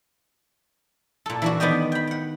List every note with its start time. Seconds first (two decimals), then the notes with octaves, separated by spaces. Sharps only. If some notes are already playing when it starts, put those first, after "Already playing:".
1.26 A#2 A4
1.42 E3 D4 F#4
1.60 D#3 B3 D5 D#5 G5
1.92 G5 B5
2.07 F#5 G5